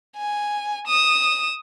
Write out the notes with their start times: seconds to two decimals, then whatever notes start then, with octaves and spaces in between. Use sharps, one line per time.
0.17 G#5
0.87 D#6 E7